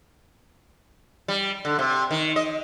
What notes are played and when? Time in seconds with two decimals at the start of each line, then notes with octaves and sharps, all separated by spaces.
1.28 G3
1.65 D3
1.79 C3
2.11 D#3
2.36 D#5